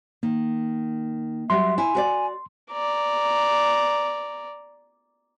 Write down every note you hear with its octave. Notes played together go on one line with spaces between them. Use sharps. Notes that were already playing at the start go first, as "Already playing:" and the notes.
D#3 A#3
F#3 G3 F#4 E5 C6
E4 G#5
F#4 B4 D5
D5 A#5